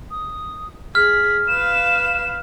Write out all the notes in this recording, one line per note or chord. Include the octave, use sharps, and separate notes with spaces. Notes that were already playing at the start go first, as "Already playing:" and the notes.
D#6
G#4 F6 B6
B4 F5 E7